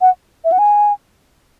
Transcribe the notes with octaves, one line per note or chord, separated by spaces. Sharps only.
F#5
E5
F#5
G#5